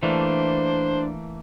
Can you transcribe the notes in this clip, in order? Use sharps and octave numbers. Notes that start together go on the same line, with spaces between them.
E3 A3 A#3 D4 C5